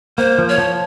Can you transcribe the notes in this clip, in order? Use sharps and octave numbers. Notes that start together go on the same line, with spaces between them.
A#3 C5
F3
C#5
F3